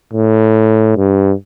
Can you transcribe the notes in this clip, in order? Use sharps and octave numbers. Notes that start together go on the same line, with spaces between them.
A2
G2